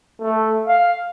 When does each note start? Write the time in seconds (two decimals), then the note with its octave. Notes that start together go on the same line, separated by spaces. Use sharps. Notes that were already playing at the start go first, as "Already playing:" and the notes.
0.21 A3
0.68 F5